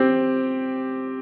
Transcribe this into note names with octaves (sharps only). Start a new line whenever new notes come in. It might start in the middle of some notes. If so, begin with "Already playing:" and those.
Already playing: C4 G4